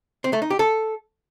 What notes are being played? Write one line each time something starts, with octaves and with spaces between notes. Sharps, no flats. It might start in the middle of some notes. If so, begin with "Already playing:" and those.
C4
A3
D#4
G4
A4